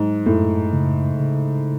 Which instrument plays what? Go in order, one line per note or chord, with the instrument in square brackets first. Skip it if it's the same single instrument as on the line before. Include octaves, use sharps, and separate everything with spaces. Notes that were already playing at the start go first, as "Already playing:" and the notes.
Already playing: [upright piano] G#2 [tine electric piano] F#3
[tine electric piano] F#2 [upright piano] A2
[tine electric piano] C#3
C#3